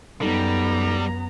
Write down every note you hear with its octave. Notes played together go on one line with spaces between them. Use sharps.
F#2 G3 B3 D#4 A4 A#5